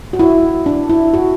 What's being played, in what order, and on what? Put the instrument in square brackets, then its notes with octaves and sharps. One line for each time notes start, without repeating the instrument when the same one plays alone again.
[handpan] F#4
E4
D4
E4
F#4